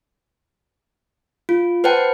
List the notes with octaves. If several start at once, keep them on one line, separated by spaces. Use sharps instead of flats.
F4
B4 C5 F#5 G5 A5